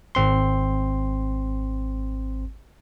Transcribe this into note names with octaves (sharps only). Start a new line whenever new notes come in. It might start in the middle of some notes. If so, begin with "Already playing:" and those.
G#1 C4 C6